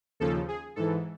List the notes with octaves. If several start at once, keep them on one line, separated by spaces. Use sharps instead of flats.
D#2 C#3 F3 A4
G#4
G#2 E3 A4